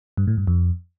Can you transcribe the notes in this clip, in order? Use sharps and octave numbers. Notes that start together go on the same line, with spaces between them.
G2
A2
G2
F2